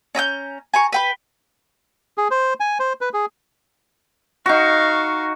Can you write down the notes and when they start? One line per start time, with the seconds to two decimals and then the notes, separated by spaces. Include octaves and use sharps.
0.15 C#4 A#5 D#6 G6
0.74 G#5 A#5 C#6
0.92 B4 G5 B5
2.17 G#4
2.31 C5
2.60 G#5
2.79 C5
3.01 B4
3.13 G#4
4.46 D#4 F#4 F5 C#6